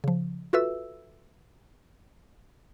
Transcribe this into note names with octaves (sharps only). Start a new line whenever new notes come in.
C#3 F3
F4 F#4 A4 B4 E5 E6